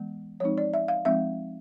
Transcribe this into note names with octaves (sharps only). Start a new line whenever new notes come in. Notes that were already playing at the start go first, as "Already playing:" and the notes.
Already playing: E3 G#3 B3
F3 G#3 C4 D#4 C#5
D5
E5
F5
F3 G#3 C4 D#4 E5